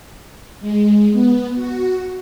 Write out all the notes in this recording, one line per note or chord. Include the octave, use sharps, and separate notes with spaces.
G#3
B3
F#4